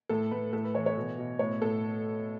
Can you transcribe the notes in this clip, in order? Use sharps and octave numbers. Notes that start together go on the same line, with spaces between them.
A2 A4
A2 B4
A2 A4
B4
E3 C#5
C#5
B2
B2
A2 C#5
A2 A4